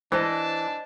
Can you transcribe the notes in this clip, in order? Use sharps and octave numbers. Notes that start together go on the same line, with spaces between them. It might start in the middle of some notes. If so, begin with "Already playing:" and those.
E3 D4 C5 D#5 A5